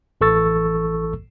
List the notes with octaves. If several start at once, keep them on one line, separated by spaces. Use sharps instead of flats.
A1 E3 A4 C#6 E6 A6